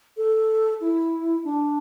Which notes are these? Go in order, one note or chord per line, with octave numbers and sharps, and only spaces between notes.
A4
E4
D4